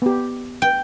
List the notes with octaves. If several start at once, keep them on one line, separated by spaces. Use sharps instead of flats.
B3 G4
G5